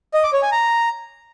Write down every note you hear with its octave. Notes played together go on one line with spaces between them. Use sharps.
D#5
D6
C#5
G#5
A#5